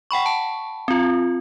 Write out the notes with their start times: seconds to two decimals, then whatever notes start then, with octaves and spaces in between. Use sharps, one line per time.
0.11 F#5 G5 B5 C#6
0.26 A5
0.88 C4 F4